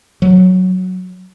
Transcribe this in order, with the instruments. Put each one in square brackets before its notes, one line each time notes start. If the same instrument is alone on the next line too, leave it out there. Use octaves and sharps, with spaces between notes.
[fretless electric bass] F#3